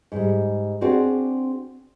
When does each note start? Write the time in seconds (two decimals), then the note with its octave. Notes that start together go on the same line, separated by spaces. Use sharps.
0.12 G#2 G3
0.81 C4 D4 F#4 G#4 D5